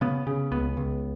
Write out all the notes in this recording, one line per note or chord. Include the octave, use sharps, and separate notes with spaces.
C#3 B3
C#3
C#2 B3
C#2